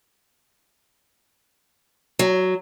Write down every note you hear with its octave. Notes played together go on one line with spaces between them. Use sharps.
F#3